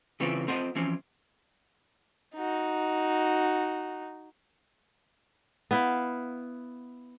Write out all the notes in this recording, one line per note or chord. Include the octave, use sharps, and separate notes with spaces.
C#3 E3 C4 C#4 F4
C4 F4 C5 D#5 F#5
E3 F3 C4 C#4
D#4 F#4
B3 E4 F5